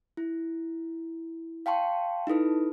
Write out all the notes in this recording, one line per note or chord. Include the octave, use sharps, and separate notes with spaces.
E4
F5 G5 A5 C6 C#6
D#4 E4 A4 B4